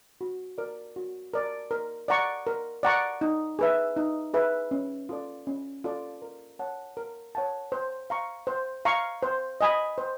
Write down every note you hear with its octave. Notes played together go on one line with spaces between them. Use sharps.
F#4
A#4 D5
F#4
A#4 D5
A#4
D5 F#5 A#5 C#6
A#4
D5 F#5 A#5 C#6
D#4
G#4 B4 E5
D#4
G#4 B4 E5
C#4
F4 A4 D5
C#4
F4 A4 D5
A#4
C#5 F#5 A5
A#4
C#5 F#5 A5
C5
F5 A#5 C#6
C5
F5 A#5 C#6
C5
D#5 G#5 B5
C5